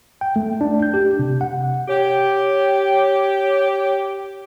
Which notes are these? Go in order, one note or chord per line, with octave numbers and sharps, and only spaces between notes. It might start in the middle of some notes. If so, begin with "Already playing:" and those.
G5
A3
D4
G6
G4
C3
F#5
G4 C#5